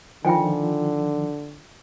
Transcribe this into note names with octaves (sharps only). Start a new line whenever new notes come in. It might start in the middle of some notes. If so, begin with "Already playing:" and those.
D3 D#3 F3 F4 G5 G#5